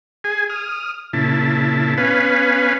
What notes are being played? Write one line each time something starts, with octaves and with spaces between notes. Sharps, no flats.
G#4 G#5
D#6 F6
A#2 C#3 E4 A5
B3 C#4 B4 F5 G#5